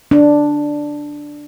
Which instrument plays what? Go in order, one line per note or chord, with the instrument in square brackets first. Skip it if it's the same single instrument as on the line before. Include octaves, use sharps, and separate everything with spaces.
[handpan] D4